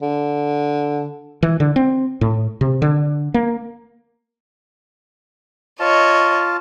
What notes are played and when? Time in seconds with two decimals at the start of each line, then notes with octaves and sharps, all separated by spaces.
0.02 D3
1.43 E3
1.60 D3
1.76 C4
2.21 A2
2.61 C3
2.82 D3
3.34 A#3
5.80 F4 C#5 D#5 A5